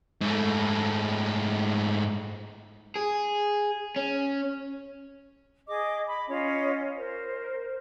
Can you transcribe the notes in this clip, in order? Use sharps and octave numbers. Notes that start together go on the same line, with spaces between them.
G#2 A3
G#4
C#4
G#4 D#5 D6
B5
C#4 F4 C#5 D#5
A#4 C5